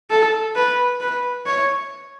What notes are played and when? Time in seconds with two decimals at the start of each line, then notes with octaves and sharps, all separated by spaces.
0.10 A4
0.55 B4
1.00 B4
1.46 C#5